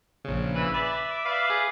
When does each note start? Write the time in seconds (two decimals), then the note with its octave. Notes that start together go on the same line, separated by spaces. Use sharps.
0.25 A#1 C#3
0.55 E3 B4 B5
0.74 B4 D5 E5
1.10 D6
1.25 B4 D5 F5
1.50 G#4